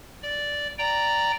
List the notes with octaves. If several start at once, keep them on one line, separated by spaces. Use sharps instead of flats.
D5
D5 G5 A#5